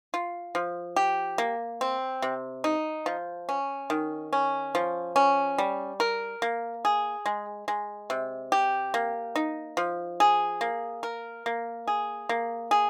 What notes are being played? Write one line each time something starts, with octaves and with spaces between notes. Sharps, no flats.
F4
F3
G4
A#3
C4
C3
D#4
F3
C#4
D#3
C#4
F3
C#4
G3
A#4
A#3
G#4
G#3
G#3
C3
G4
A#3
D#4
F3
G#4
A#3
A#4
A#3
G#4
A#3
G#4